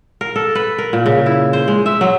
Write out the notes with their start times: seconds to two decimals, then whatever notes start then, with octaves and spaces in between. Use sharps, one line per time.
0.21 A#4
0.36 A4
0.55 B4
0.78 A#4
0.93 A#2
1.06 C#3
1.26 E4
1.53 C5
1.68 G#3
1.86 E5
2.01 F#3